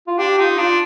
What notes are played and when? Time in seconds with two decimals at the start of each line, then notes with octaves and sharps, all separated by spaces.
0.07 F4
0.19 D4 G4
0.39 D#4 F4
0.58 D4 F4